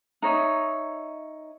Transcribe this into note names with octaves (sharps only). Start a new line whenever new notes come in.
D#4 C#5 E5